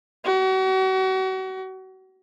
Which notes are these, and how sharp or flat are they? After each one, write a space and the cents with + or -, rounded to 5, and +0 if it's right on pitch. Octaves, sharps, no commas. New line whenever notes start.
F#4 +35